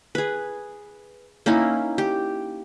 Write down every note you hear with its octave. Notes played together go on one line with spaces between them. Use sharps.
G#4 B4
A#3 C#4 D#4 E4
G4